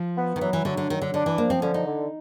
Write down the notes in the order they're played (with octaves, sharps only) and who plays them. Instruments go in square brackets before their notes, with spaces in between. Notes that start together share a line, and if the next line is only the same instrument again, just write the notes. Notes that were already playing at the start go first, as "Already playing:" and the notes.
Already playing: [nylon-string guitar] F3
[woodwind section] B3
[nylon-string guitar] D#3
[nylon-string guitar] E3 [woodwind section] F#3
[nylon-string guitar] E3
[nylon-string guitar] D3 [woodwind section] F#3
[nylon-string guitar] D3
[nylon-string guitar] D#3 [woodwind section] F#3
[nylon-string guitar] D3
[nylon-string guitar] D3 [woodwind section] D4
[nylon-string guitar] E3
[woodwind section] F3 [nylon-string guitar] A#3
[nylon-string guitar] C4
[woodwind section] D3 [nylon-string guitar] C#4
[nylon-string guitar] D#4
[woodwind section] D3